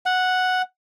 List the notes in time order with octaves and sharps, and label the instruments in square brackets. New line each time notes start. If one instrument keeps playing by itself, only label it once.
[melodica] F#5